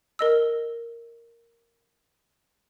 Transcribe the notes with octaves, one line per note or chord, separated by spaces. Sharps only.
A#4 D#5 E6